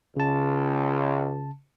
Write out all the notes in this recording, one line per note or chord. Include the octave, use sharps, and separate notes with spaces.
C#2 C#3 A5